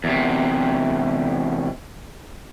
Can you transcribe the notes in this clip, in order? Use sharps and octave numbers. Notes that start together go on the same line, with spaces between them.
E2 C3